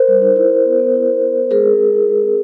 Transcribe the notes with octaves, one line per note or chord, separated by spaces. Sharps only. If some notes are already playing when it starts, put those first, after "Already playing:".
Already playing: A#4 C5
G3
D#4
E4
E4
B3
B3
E4
E4
B3
B3
G#3 G#4 A#4
C4
G#3
E4
G#3
C4